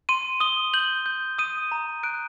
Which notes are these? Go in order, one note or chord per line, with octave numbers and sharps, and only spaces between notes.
C6 D#7
D#6 G7
G6 F#7
G6
D#6 D#7
A#5
F#6 D7